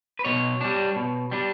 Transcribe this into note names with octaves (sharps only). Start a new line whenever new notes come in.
B4
B2 C#5
G3 D4
B2
G3 D4